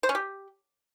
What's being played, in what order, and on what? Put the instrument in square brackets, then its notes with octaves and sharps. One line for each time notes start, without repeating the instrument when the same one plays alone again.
[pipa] C5
C#4
G4